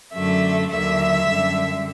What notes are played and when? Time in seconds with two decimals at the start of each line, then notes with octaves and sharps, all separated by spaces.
0.14 F#2 D3 F#3 A3 E5
0.71 D#2 D3 F#3 E5
1.28 F#2 D3 G3